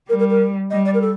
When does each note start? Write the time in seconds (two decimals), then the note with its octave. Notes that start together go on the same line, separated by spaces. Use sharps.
0.09 G3 A#4
0.19 A#4
0.30 A#4
0.70 G3 D#5
0.85 D5
0.94 A#4
1.01 A4